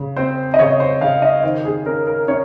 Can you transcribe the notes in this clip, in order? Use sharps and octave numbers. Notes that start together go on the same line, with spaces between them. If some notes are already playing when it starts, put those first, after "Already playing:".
Already playing: C#3
C4 C5
D#5
C#3 C#5
C5
C#3 F5
D#5
D#3 C5
G#4
C#4 A#4
A#4
C#4 C#5